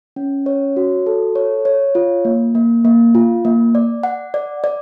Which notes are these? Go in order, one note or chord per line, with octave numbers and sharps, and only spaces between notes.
C#4
C#5
F#4
A4
C#5
C#5
F4
A#3
A#3
A#3
F4
A#3
D5
F#5
D5
D5